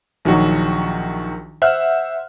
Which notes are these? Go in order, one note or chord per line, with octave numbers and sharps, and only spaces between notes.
A#1 D#3 F#3 F#4 D#5
C5 E5 F#5 F6 F#6